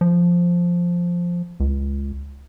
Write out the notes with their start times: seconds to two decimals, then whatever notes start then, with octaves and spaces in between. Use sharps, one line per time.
0.01 F3
1.60 C#2